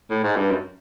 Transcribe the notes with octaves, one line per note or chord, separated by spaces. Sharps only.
A2
G#2
G2
F#2